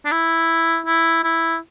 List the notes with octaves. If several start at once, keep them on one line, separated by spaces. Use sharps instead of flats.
D4
E4
E4
E4